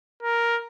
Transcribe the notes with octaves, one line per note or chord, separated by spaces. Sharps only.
A#4